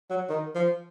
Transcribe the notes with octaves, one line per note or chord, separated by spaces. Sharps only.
F#3
D#3
F3